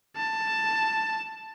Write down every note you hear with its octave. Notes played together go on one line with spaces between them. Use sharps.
A5